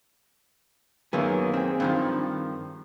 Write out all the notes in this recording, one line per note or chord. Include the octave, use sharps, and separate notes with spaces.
F#2 D#3 F#3 A#3 B3 G#4
C4 G#4
G2 D#3 F3